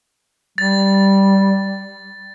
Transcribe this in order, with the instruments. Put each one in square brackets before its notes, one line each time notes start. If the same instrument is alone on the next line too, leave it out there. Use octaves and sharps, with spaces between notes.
[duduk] G3 [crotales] A6